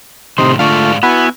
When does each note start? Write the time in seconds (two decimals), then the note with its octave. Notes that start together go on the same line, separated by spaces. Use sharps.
0.38 A2 C3 D#3 C4 D#4 C6
0.59 G#2 D3 A3 F4 D5 F5 C#6
1.03 B3 E4 F#4 F#5 G#5 B5